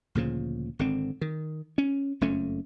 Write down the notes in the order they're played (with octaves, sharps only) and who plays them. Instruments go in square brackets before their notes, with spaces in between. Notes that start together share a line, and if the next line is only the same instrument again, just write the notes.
[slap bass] D2 A#2 C#3 F3
G#1 D3 C4
D#3
C#4
F#1 F2 A3 C#4